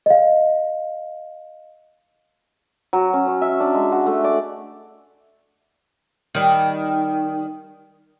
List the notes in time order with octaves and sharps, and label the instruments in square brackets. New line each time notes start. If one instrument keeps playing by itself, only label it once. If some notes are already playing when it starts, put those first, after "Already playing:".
[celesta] D#5 F5
[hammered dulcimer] F#3
C#4
C#5
E5
D4
G#3
F#4
A3
D5
[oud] D#3 G3